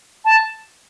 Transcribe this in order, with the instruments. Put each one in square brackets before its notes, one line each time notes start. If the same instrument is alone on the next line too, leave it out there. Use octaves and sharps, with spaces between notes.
[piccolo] A5